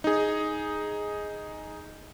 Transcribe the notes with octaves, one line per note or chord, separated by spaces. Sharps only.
D#4 G#4